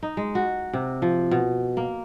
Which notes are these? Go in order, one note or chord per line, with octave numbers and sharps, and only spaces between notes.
D#4
G#3
F#4
C3
F3
B2
A#3